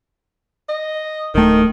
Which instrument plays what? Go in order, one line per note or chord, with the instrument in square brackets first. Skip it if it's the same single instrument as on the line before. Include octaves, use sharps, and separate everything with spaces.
[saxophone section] D#5
[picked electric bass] D1 A3 [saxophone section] D#3